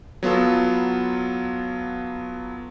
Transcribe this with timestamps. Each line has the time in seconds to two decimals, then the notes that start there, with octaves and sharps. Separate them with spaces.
0.23 F#3 B3 F4 A4